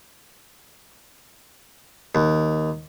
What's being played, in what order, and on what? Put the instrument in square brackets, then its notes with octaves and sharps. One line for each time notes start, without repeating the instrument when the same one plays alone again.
[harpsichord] D#2